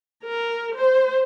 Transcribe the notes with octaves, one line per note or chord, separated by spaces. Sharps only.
A#4
C5